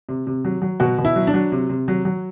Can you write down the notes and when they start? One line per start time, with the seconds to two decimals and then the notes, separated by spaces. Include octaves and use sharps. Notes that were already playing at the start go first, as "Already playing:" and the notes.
0.09 C3
0.27 C3
0.45 F#3
0.62 F#3
0.80 B2 F#4
0.98 B2
1.05 E4
1.16 F#3
1.27 D4
1.34 F#3
1.52 C3
1.69 C3
1.88 F#3
2.05 F#3